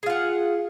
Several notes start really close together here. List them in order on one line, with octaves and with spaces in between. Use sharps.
G#4 F4 F#5